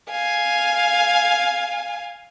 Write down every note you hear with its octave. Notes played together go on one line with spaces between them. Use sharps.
F5 G#5